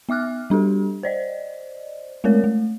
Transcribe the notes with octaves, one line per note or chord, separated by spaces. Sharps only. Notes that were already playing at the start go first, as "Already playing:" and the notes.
B3 E5 D6 F6 F#6
G3 D4 G4 A4
C5 D5 D#5
G#3 A3 C4 A#4 C#5
A3